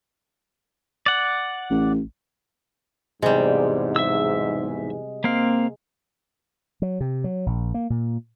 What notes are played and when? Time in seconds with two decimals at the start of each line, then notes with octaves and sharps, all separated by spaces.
1.06 D5 F#5
1.70 A1
3.22 B1 E2 G#2 C3 G3 G#3
3.96 E5 E6
5.24 A#3 C4 F5
6.82 F#3
7.00 C3
7.24 F#3
7.46 A#1
7.74 A#3
7.90 A#2